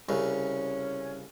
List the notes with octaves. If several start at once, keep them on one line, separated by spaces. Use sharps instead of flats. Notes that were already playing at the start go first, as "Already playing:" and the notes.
C2 C#3 C#4